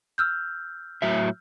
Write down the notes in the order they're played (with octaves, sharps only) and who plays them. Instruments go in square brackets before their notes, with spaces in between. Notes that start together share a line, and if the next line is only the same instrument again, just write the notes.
[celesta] E6 F6 G6
[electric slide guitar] A2 F#3 E5